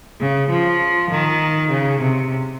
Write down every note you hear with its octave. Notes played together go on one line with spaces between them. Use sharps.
C#3
F3
D#3
C#3
C3